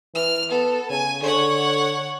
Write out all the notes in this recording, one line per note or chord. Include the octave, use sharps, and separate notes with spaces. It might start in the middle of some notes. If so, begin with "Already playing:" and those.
E3 F6
B3 A4
C#3 G#5
D3 C#5 F#5